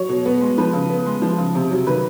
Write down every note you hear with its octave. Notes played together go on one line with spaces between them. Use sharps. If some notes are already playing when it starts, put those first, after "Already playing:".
Already playing: F#3 C#5
B2
B3
G#3
F3 B4
C#3
B3
G#3
F3
C#3
C3
F#3
D#3 B4